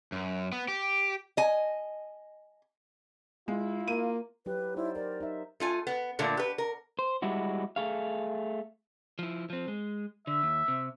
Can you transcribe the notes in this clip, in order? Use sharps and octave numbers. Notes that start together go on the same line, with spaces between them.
F#2
B3
G4
D#5 G#5
G#3 E4 F4
A#3 D#7
F#3 E4 G4 B4
D#4 E4 C5 D5
A#4 D5
D#4 E5
A3 F4 G#5
B3
A#2 D3 A3 A#3
G4 B4
A#4
C5
G3 G#3 E4 F#4
A3 G#4 F5
F3 E4
F3 C4
G#3
D3 E5
D#2
C3